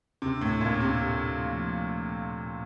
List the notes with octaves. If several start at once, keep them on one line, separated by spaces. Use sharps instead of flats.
D2 C3
A2
D2 A#2
C3
G4
F3